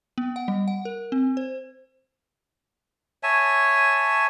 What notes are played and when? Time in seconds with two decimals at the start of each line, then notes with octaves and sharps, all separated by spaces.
0.18 B3
0.36 F#5
0.48 G3
0.68 F#5
0.85 A#4
1.12 C4
1.37 C5
3.23 C#5 E5 G#5 A5